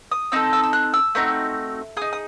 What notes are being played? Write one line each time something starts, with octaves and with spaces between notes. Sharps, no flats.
D#6
C4 D#4 A4 E6
E6
E6
F#6
E6
A3 C4 D#4 F#4
D#4 G#4 D#6
D#6